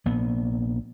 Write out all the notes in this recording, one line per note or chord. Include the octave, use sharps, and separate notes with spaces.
A#1 A#2 B3